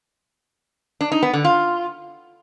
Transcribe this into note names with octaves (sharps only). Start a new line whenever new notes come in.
D4
D#4
B3
D3
F4